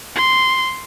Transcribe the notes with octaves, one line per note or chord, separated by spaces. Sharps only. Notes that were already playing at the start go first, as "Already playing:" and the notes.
C6